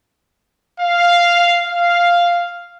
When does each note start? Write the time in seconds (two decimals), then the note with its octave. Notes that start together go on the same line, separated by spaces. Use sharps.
0.80 F5
1.67 F5